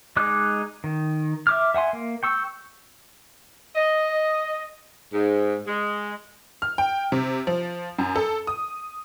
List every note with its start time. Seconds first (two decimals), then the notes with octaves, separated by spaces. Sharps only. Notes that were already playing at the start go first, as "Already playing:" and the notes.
0.17 G#3 D#4 D6 F#6
0.84 D#3
1.47 E5 D6 F6
1.75 E5 F#5 G#5 C6
1.93 A#3
2.23 G5 C#6 E6
3.76 D#5
5.13 G#2
5.67 G#3
6.62 F6
6.78 G5
7.12 C3
7.47 F3
7.99 F#2
8.16 A4
8.47 D#6